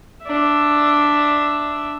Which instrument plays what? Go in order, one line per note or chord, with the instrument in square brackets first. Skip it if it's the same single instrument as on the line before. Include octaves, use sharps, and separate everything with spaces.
[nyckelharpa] D4 E5